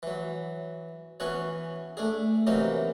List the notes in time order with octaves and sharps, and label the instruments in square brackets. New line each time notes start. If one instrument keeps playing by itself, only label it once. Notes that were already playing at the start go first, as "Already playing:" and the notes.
[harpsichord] E3 F#3
E3 B3 C#4 F#4 C#5
A3 D4 G#4
C3 E3 F#3 A#3 C#4 D#4